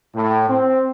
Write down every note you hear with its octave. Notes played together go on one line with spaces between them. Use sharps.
A2
C4